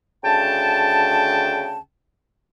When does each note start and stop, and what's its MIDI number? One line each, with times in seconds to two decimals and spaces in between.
0.24 1.78 38
0.24 1.78 49
0.24 1.78 79
0.24 1.78 81